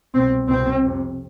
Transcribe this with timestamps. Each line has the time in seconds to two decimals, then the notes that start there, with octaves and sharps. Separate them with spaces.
0.14 C2 B2 C4
0.48 C2 B2 C4
0.83 F2 C3